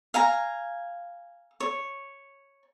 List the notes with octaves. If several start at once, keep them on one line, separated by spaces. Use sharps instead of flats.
F5 G#5 A#5
C#5